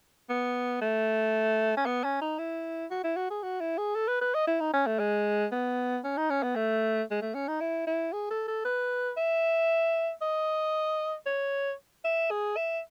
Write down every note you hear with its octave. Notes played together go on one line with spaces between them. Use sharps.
B3
A3
C#4
B3
C#4
D#4
E4
F#4
E4
F#4
G#4
F#4
E4
G#4
A4
B4
B4
D#5
E4
D#4
C#4
A3
G#3
B3
C#4
D#4
C#4
B3
A3
G#3
A3
C#4
D#4
E4
E4
G#4
A4
A4
B4
E5
D#5
C#5
E5
G#4
E5